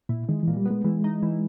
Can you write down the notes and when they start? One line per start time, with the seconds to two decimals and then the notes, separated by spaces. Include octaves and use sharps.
0.09 A#2 E4
0.29 D#3 G#3
0.43 A#2 E3
0.57 G3
0.65 B3
0.71 G#3
0.84 E3 G#3
1.04 D#4
1.23 E3